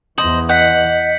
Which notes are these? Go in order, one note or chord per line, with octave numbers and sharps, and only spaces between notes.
E2 E3 C5 D#5 F#7
D#5 F#5 G6 B6 C#7